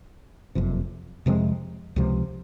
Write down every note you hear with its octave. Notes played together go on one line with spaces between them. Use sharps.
F#1 F2 C3
F2 C3 F3 G#3
C#2 C3 F3